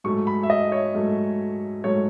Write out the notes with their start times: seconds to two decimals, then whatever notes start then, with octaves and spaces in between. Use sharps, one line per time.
0.04 G#2 F#3 A3 C#6
0.27 B5
0.43 E5
0.50 D#5
0.72 C#5
0.94 G#2 F#3 A3
1.84 G#2 F#3 A3 C#5